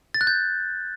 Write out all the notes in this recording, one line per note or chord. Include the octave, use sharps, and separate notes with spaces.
A6
F#6
G6